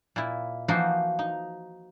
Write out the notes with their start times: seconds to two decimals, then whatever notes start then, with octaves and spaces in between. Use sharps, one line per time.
0.16 A#2 E4
0.68 E3 F3 A#3 D#4 F#4 C5
1.19 D#4